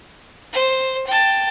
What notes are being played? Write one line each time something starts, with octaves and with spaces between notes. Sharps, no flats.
C5
G5 A5